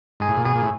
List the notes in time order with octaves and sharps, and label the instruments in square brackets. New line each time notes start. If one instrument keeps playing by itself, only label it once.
[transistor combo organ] G#2 [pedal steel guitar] G#4
[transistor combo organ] A2
A#2
[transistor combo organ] B2 [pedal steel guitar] G#4
[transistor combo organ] A#2
A2